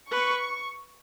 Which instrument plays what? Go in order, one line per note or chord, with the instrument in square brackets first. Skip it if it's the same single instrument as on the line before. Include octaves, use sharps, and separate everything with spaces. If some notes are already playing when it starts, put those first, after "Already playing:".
[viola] B4 [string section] C#6